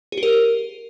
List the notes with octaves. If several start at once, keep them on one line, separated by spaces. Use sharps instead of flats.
G#4
G4
A#4